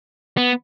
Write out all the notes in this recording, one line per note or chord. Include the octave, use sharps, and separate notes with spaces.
B3